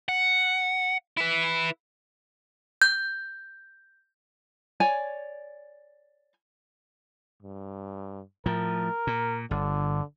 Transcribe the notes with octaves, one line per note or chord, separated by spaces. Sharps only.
F#5
E4 B4
G6
C#5 D5 G#5
G2
A2 F3 A#4
A#2
G1 D3